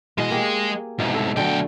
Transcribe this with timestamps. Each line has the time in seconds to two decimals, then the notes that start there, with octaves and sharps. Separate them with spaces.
0.18 B2 E3 G#3 D#5
0.30 A#3 G4 G#4
0.99 C2 G#2 B2
1.14 A4
1.37 D2 D3 F#3 G5